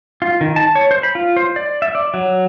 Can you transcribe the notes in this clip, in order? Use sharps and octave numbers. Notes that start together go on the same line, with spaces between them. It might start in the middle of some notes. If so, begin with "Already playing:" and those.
F4
D#3
A5
C#5
C5
B5
F4
C5
D5
E5
D5
F#3